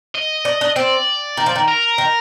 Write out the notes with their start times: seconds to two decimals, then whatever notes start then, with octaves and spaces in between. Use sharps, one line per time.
0.15 D#5
0.45 D4
0.61 D4
0.76 C4 D5
1.37 D#3
1.46 F3
1.55 D#3
1.68 A#4
1.98 D#3